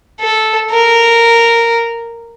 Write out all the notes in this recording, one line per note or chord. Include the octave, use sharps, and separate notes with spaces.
A4
A#4